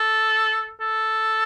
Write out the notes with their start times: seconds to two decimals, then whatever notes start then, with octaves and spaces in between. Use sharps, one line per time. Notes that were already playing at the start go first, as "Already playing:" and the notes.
Already playing: A4
0.80 A4